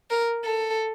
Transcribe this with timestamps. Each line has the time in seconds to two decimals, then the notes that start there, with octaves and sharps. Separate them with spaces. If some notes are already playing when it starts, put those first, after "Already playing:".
0.10 A#4
0.44 A4